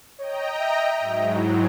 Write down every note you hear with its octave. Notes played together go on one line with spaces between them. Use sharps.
C#5 D#5 G5 A#5
E5
G#2 F#3
E4